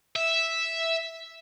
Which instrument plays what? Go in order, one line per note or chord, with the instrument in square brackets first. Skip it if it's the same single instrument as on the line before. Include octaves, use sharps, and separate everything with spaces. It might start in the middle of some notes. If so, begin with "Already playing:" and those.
[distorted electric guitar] E5